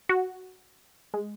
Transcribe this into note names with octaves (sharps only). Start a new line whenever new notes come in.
F#4
G#3